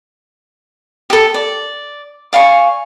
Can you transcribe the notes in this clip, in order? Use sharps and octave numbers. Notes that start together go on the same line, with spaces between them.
G4 A4
D5
D5 F5 G#5 C#6